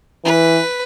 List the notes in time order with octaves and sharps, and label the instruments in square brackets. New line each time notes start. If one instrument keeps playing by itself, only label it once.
[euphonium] E3 [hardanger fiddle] B4